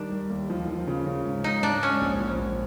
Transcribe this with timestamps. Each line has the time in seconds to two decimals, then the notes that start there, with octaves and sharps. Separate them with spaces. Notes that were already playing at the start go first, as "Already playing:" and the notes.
Already playing: D#3 G3 D4
0.11 G3
0.30 D#2
0.50 F3
0.68 F3
0.87 C#3
1.07 C#3
1.26 G#2
1.44 G#2 D#4
1.63 G#2 D4
1.82 G#2 C#4
2.01 A#1
2.20 A#1
2.39 A#1